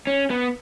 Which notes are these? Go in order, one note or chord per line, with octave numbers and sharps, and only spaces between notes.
C#4
B3